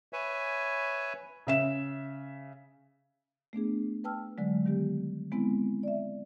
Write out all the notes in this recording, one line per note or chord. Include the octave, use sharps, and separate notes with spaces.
B4 C#5 E5 G#5
C#3 E5 E7
A3 B3 D4 G#4
B4 G5 A5 E6 F6
D3 F#3 G#3
D#3 G3 B3 G4
G#3 B3 C4 E4
D5 E5